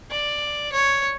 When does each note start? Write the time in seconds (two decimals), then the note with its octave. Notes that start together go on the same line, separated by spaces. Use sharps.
0.11 D5
0.72 C#5